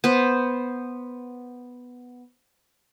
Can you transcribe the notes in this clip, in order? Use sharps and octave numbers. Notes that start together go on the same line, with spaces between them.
B3 C5